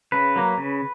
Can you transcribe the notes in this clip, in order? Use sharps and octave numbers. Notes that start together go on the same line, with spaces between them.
C#3 B4
F#3 A#3
C#3